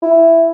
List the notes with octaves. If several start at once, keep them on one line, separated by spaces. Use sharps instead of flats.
E4